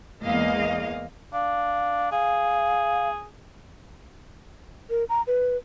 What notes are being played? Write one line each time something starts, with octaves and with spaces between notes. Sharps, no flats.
E2 G#3 A#3 D#5 F5
D4 F5
G#4 F5
A#4
A#5
B4